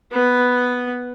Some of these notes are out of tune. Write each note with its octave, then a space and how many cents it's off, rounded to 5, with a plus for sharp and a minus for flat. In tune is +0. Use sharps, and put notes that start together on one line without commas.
B3 +0 B4 +0